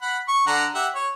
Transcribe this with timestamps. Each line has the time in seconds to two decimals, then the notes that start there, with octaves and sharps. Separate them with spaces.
0.02 F#5 B5
0.28 C#6
0.47 D3 F#5 A#5
0.75 G4 E5 F#5
0.95 C#5